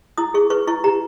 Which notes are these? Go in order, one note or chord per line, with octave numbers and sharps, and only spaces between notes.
E4 D#6
G#4 C#6
B4 C#6
E4 C#6
G4 A#5